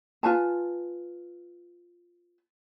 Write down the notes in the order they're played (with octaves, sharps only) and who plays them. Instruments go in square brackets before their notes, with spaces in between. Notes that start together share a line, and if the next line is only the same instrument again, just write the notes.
[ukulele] F4 B4 G#5 A5